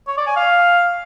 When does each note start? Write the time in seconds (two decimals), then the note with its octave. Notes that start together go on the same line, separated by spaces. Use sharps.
0.08 C#5
0.17 D5
0.27 G#5
0.36 F5